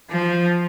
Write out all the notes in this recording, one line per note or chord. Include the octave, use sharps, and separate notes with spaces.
F3